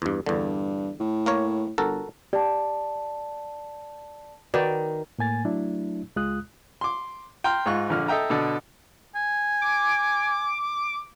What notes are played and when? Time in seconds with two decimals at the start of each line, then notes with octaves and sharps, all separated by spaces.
0.02 E2 G2
0.26 E2 G2 D3
1.00 A2
1.26 A#3 A#4 C#5
1.78 G1 F#4 A4 A#4
2.33 G4 D5 A5
4.54 D#3 F#4 B4 D5
5.18 A2 A#3 G#5 A6
5.45 F#3 A3 D4 E4
6.16 C#2 G#3 F4 D#6 F#6
6.81 C6 D6
7.44 G5 A#5 C6 F6
7.66 G#2 D#4 F4 C#6 F#6
7.90 A#1 D3 F6
8.08 A4 D#5 E5 G5 A#5
8.30 B2 D3 A4
9.15 G#5
9.62 D6